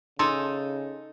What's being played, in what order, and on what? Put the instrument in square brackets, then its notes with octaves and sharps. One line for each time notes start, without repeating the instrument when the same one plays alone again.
[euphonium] C#3 [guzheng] D#4 A4 G#5 [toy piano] C6